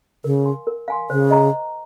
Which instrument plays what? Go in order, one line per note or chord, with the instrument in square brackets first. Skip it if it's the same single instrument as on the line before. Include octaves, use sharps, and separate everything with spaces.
[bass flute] C#3 [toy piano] A#4
[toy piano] F5 G#5 C6
A#4
F5 G#5 C6
[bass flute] C#3 [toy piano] C5
[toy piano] D#5 A#5